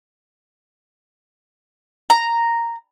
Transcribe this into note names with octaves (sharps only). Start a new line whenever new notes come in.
A#5